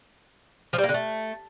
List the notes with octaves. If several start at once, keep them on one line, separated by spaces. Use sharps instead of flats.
F3
G3
A#3
D3
A3